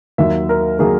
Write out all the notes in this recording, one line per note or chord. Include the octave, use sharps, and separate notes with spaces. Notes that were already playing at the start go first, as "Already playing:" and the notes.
D#2 D#3 F#3 A#3 E5
A#4
D#3 F#3 A#3 G#4